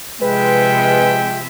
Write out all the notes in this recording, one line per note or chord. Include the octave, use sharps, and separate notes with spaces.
C3 F3 G#3 B4 E5 G5